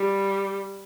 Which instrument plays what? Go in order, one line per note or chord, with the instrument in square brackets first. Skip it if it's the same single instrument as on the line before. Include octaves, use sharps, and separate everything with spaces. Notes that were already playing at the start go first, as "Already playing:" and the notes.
Already playing: [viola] G3